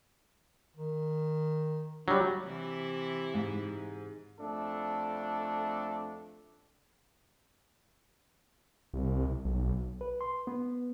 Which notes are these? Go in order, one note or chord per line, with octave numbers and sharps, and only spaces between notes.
D#3
F#3 G3 D4
C3 E3 E4
G#2
F2 A3 D4 A4
C2
B1
B4
C6
B3